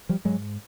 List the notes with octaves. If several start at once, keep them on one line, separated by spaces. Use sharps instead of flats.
F3 G3
G#2 F#3 G#3